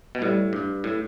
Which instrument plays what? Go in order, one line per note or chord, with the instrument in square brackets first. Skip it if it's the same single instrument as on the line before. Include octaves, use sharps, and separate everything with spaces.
[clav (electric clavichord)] B2
[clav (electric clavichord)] A2 [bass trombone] G3
[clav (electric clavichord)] G2
A2